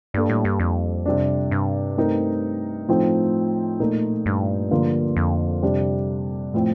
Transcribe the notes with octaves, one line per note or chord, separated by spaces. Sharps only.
G2 G3 A#3 D4 A4
A2
G2
F2
C3 G3 D4
G2
A3 C4 D#4 A#4
A2 F3 A3 C4 D#4
A#2 A3 D#4 A#4
G2
D3 F3 A#3 F4 A#4
F2
C3 G3 D4 G4
A2 F3 C4